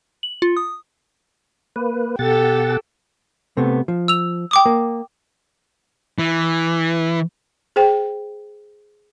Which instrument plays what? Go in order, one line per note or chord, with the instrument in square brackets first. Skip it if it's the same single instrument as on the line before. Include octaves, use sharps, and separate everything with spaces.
[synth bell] F#7
F4
D#6
[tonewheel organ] A#3 B4
[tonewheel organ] B2 F#5 A6 [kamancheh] G4 A4
[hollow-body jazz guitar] C3 A3 B3
F3
[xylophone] E6 F7
G5 D6 D#6
[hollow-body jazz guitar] A#3
[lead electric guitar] E3
[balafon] G#4 C5 G5